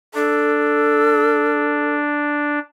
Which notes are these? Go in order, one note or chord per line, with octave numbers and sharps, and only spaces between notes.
D4 A4